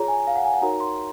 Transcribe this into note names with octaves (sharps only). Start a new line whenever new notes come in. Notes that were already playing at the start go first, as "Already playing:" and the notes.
Already playing: F4 G#4 C#5 A#5
G#5
F5
F#5
G#5
F#5
D#4 F#4 A#4 C#5 A#5
C6